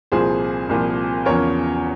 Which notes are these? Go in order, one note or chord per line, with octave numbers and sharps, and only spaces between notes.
C2 A#2 F3 G#4 C5
C2 A#2 F3
E2 C#3 F3 A#4 C#5